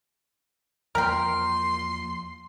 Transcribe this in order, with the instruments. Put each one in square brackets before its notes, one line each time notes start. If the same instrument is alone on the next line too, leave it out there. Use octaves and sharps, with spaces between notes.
[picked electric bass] E2 F3 A#3 [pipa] A#4 G5 [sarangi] C6